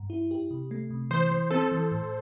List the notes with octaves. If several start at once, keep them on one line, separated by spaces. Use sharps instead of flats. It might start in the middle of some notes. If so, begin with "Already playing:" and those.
Already playing: G2
E4
G4
C3
A3
C3
E3 C5
E3
C4 A4
E3
A2